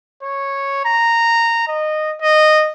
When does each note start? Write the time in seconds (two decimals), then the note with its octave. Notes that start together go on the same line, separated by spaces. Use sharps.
0.23 C#5
0.85 A#5
1.68 D#5
2.22 D#5